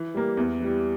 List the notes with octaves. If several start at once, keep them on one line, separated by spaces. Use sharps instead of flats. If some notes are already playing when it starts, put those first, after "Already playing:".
Already playing: E3
G3 A#3
E2
E3 G3